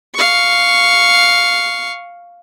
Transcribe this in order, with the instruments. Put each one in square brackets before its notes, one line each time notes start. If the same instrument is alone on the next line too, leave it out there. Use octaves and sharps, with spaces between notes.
[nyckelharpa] F5 C#6